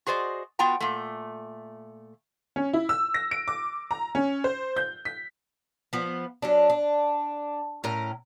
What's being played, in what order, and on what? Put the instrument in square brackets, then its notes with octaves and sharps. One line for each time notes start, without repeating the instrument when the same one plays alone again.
[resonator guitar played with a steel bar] F#4 G#4 C5 D5 D#5
B3 F4 F#4 G5 A#5
A#2 A3
[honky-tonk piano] C#4
E4
E6
A#6
D7
D6
A#5
C#4
C5
G6
B6
[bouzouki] F3 B3
F#3 C#4 D4
D4
A2 C#4 A#4 A#5